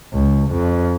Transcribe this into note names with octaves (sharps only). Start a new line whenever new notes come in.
C#2
F2